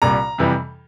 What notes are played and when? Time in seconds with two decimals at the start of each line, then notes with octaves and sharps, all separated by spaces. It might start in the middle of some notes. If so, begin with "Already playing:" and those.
0.02 C2 A#2 G3 A#5
0.38 F2 C3 E3 G3